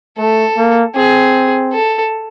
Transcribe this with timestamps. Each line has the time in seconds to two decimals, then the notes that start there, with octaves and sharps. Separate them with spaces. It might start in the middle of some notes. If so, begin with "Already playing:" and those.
0.18 A3 A4
0.57 A#3
0.96 C4 G#4
1.73 A4